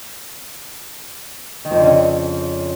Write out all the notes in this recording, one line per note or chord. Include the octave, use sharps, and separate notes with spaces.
D#3
F2
D3
C#3